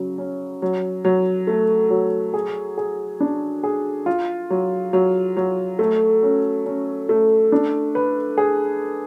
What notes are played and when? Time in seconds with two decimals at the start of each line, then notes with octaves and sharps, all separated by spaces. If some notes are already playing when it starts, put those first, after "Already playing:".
Already playing: C#3 F#3
0.18 C#4
0.62 F#3
1.05 F#3
1.47 A3
1.90 F#3
2.34 G#4
2.78 G#4
3.20 D4
3.64 G#4
4.06 F4
4.50 F#3
4.93 F#3
5.37 F#3
5.79 A3
6.23 C#4
6.66 C#4
7.09 A3
7.52 D4
7.95 B4
8.38 G#4